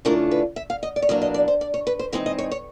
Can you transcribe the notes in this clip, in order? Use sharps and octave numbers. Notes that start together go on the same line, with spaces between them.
C#3 E3 A3 D4 F4 A#4
B4
E5
F5
D#5
D5
C#5
E2 B2 F#3 A#3 D4 D5
D#5
D5
C5
D5
C#5
B4
C5
E3 G#3 C4 D#4 D#5
D#5
C#5
C#5